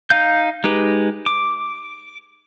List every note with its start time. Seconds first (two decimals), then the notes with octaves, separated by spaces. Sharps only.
0.10 D#4 F5 G6
0.64 G#3 D#4 G4 B4
1.26 D6